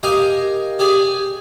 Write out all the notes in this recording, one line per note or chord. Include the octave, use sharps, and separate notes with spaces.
G4 A#4 D#5 F5 G5 G#5
G4 G#4 D5 G#5